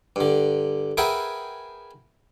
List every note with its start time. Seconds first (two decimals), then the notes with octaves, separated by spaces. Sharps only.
0.16 G2 D3
0.97 G#4 A#4 B4 E5 F#5 G5